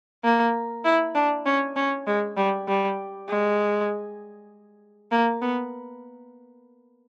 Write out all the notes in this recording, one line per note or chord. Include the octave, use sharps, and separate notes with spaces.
A#3
E4
D4
C#4
C#4
G#3
G3
G3
G#3
A#3
B3